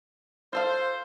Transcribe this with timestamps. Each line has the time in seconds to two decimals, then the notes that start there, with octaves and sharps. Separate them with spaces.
0.53 F4 A4 C5 F5